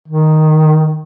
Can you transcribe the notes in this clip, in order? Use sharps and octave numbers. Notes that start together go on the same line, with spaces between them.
D#3